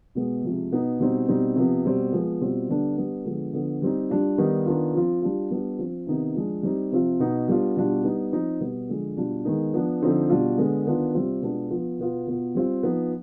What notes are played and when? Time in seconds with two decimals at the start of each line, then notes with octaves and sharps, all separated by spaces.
0.15 B2 G#3 B3
0.43 C3 F3 G#3
0.72 B2 B3 D#4
1.00 B2 G3 C4 D#4
1.28 B2 G3 C4 D#4
1.56 C3 F3 B3
1.84 B2 G3 C4
2.12 F3 G#3 B3
2.41 B2 G3 C4 F4
2.69 D3 G3 B3 D4
2.97 G3 B3 D4
3.25 D3 F3 G#3 B3
3.53 D3 F3 B3
3.82 G3 C4 D#4
4.10 G3 D4 F4
4.38 D#3 G3 B3 D#4
4.66 D#3 B3 D4 F4
4.94 F3 C4 F4
5.22 G3 D4 F4
5.51 G3 B3 D4 F4
5.79 F3 C4 F4
6.07 C3 D#3 B3 D#4
6.35 F3 G#3 D4
6.63 G3 C4 D#4
6.92 C3 F3 C4 F4
7.20 B2 B3 D#4
7.48 G3 B3 D4 F4
7.76 B2 G3 D4 F4
8.04 G3 B3 D#4
8.33 F3 C4 D#4
8.60 B2 G3 B3
8.89 D3 F3 G#3
9.17 B2 G3 D4 F4
9.45 D#3 G#3 B3 D#4
9.74 F3 B3 D4
10.02 D3 F3 C4 D#4
10.30 B2 G3 D4 F4
10.58 D3 G#3 B3
10.86 D#3 B3 D4 F4
11.14 C3 G3 C4 F4
11.42 B2 G#3 B3 D4 F4
11.70 F3 B3 F4
11.99 B2 B3 F4
12.27 B2 B3 F4
12.55 G3 C4 F4
12.83 F3 B3 D#4